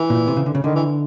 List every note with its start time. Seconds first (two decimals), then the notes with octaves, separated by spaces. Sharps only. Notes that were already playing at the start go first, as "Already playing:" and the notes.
Already playing: E3
0.10 A#2
0.27 C3
0.37 C#3
0.46 D3
0.55 C#3
0.64 D3 D#3
0.75 E3